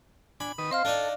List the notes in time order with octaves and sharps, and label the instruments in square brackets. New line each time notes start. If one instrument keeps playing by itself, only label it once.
[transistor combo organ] D4 G#5 [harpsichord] B5
[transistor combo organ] D#3 B4 D#6
[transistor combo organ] C4 C5 [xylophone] D#5 F5 F6
[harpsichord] D4 D#4 [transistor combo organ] A4